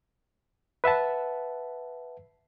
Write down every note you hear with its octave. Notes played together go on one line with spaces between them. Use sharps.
B4 E5 F#5 A5